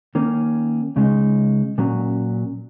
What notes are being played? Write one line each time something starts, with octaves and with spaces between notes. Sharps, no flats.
D#3 A#3 C#4
C#3 G#3 D#4
A#2 F#3 C#4